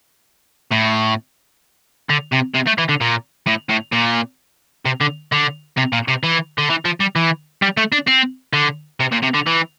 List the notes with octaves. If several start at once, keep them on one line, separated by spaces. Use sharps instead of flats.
A2
D3
C3
C3
A3
E3
D3
A#2
A2
A2
A#2
C3
D3
D3
C3
A#2
C3
E3
D3
E3
F3
G3
E3
G3
A3
D4
C4
D3
C3
A#2
C3
D3
E3